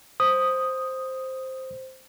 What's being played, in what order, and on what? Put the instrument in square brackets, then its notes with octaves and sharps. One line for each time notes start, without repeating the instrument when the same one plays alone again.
[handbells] C5 [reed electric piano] D#6